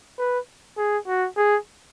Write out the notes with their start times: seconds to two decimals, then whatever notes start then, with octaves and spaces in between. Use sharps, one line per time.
0.18 B4
0.77 G#4
1.07 F#4
1.36 G#4